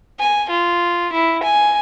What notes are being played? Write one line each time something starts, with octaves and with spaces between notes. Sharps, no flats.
G#5
F4
E4
G#5